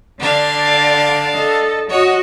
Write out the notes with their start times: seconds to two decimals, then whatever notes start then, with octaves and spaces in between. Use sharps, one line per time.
0.20 D3 D4 D5 F5
1.35 A4 D#5
1.90 F#4 C#5 D#5